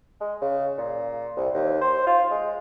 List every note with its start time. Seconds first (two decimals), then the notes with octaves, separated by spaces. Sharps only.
0.21 G#3
0.41 C#3
0.78 A#2
1.37 C2
1.54 D#2
1.81 C5
2.07 F4
2.31 G#3